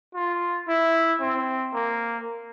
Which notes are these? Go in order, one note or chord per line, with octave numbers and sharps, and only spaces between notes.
F4
E4
C4
A#3